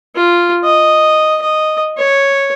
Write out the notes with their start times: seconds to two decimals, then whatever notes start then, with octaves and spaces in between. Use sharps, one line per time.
0.15 F4
0.64 D#5
1.42 D#5
1.97 C#5